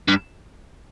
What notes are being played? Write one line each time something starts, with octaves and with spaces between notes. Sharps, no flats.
G2